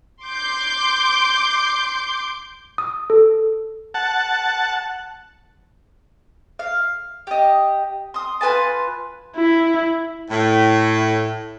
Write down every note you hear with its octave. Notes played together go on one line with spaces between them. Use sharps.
C6 D6 G6
D#6
A4
F#5 A5
F5
G4 D#5
C6 D#6
F4 B4 G#5 A5
E4
A2